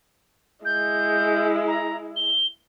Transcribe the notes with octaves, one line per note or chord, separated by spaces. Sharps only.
G#3 E4 G6
A#5
G7